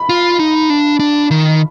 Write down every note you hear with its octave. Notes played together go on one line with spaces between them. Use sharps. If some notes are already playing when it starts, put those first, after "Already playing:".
Already playing: B5
F4
D#4
D4
D4
D#3